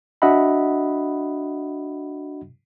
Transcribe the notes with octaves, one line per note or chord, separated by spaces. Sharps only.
D4 F#4 D#5 E5 F#5 B5